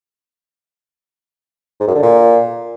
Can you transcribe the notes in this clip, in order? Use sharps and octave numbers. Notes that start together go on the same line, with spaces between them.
G#2
F#2
D3
A#2